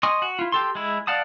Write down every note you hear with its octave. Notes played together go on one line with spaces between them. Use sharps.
D#5 G#5 C6 C#6 D#6
F#4
E4 F4
G4 A4 C6
G#3 E4
D5 F5 F#5 A5 D#6